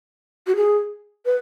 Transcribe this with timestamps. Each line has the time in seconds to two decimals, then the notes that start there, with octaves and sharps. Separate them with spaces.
0.47 F#4
0.56 G#4
1.26 B4